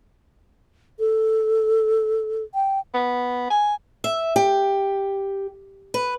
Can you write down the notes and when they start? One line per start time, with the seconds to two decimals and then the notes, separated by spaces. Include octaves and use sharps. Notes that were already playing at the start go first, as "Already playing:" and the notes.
0.99 A4
2.55 G5
2.94 B3
3.50 G#5
4.04 E5
4.36 G4
5.94 B4